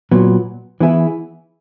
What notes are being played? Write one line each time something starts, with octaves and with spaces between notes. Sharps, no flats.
A#2 F#3 B3
E3 B3 E4 G#4